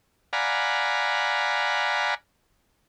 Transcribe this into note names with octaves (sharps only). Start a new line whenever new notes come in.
D5 F5 F#5 G#5 A#5 B5